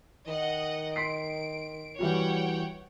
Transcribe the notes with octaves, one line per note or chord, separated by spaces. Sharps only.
D#3 D#5 F#5
C6 B6 C7 D7
E3 G3 F#4 C#5 F#5 G5